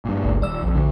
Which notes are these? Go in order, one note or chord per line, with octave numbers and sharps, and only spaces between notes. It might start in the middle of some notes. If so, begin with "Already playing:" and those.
G2 A#2
G1 C#2
D#1 D5 E6
A#1 F2
D2 D3